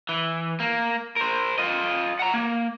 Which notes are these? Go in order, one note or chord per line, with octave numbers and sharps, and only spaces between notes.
E3
A#3
A#4 C5
F4 D#5
F#5 A#5
A#3